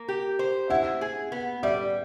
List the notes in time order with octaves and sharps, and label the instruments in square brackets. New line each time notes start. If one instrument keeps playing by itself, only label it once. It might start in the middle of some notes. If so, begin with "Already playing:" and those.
Already playing: [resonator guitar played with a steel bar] A#3
G4
C5
[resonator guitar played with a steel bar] E4 [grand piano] E5 F#5
[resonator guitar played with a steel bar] G#4
B3
[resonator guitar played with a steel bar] G3 [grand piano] D5 E5